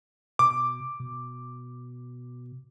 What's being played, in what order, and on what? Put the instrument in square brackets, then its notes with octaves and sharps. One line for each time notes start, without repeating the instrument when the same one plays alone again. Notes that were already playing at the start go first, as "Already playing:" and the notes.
[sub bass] B2 [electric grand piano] D6
[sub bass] B2